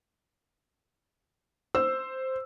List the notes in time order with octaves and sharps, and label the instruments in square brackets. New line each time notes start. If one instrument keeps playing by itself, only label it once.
[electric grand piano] C5 [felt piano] E6